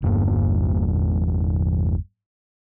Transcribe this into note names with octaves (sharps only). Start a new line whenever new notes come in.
G1 E2 G2 A#3